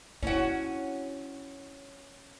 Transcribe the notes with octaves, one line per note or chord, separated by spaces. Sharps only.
C#4 D4 E4 F#4